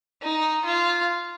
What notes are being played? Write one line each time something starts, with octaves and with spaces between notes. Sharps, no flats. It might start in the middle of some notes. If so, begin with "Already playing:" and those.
D#4
F4